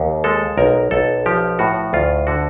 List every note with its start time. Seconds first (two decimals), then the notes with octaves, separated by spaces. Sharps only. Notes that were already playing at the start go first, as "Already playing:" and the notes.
Already playing: D#2
0.24 G#3 A4
0.58 B1 A#4
0.91 B1 A4
1.26 F3 G4
1.59 A2 F#4
1.93 D2 F4
2.27 D3 F#4